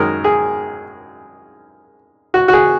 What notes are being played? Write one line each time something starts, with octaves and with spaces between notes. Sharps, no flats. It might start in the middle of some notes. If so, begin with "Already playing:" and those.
Already playing: F#2 D#3 G#3 A#4
G#4
F#4
F#4
G#4